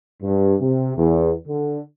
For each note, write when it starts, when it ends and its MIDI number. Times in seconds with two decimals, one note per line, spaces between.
0.21 0.54 43
0.60 0.92 48
0.96 1.31 40
1.47 1.78 50